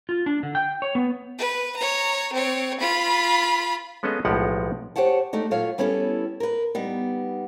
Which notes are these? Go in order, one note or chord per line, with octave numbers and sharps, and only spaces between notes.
F4
D4
D3
G5
C#5
B3
B4
C#5 A#5
C4 C#5
F4 B5
G#3 B3 C#4 A4 D#5 F5
B1 A2 F3 G#3 G4 F#5
G4 C5 C#5 F#5 A5
A3 D4 D#4
A#2 F#3 A3 F4 C#5 F5
G3 B3 C#4 E4 G#4 A4
A#4 B4
G3 B3 D#4